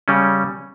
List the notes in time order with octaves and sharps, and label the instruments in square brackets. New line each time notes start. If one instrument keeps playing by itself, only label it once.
[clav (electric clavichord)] C#3 G3 C#4